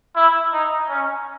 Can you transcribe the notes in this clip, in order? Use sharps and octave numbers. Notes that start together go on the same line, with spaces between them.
E4
D#4
C#4